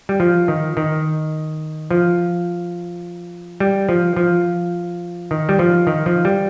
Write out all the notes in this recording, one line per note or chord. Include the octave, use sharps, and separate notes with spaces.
G3
F3
D#3
D#3
F3
G3
F3
F3
D#3
G3
F3
D#3
F3
G3